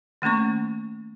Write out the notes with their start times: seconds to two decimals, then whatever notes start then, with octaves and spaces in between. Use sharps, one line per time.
0.22 D#3 A3 A#3 C#4 C#6